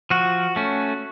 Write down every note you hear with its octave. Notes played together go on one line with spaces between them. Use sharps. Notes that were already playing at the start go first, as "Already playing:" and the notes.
F3 F#4
A3 C#4